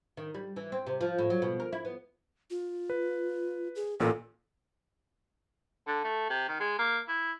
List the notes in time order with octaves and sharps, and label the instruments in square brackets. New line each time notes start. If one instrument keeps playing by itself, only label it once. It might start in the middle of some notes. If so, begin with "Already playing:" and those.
[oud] D#3
G3
E3
C4
C3
F3
A2
F#3
B2
A#4
E4
B3
[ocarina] F4
[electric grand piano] B4
[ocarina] G#4
[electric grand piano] A1 A#2 [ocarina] A4
[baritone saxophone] D3
A3
C3
D#3
G#3
A#3
E4